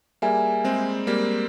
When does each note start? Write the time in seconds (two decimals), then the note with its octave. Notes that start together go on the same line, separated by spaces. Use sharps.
0.22 G3 A#3 G#4 E5 G#5
0.64 G#3 C4
1.07 G3 A#3